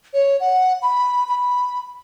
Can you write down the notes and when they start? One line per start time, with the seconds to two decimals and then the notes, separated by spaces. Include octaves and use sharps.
0.14 C#5
0.40 F#5
0.82 B5
1.28 B5